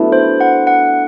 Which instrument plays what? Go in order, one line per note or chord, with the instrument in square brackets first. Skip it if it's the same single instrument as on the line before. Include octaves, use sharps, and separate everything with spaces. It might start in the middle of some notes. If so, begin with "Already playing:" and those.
Already playing: [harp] A3 B3 D4 E4 F#4
[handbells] C5
F#5
F#5